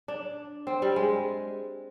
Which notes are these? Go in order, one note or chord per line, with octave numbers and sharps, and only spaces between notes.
D4
C4
G3
G#3